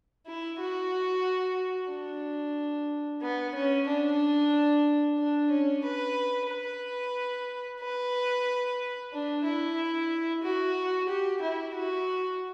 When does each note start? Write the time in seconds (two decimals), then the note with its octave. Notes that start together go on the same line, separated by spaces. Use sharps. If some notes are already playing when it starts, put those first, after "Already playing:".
0.27 E4
0.60 F#4
1.90 D4
3.22 B3
3.55 C#4
3.88 D4
5.19 D4
5.51 C#4
5.84 B4
6.50 B4
7.81 B4
9.13 D4
9.44 E4
10.43 F#4
11.09 G4
11.42 E4
11.75 F#4